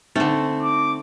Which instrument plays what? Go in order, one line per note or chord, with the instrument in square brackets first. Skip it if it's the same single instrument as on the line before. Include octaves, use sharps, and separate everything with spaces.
[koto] D3 A3 [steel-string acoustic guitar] C4 [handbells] D#4
[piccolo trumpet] D6